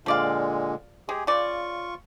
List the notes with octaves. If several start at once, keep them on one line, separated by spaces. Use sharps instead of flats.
A#2 D3 F3 G#3 D5 F5
G#3 G4 G#4
C#3 F4 D5 C#6